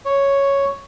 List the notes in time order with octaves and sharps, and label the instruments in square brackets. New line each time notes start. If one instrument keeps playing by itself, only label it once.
[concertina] C#5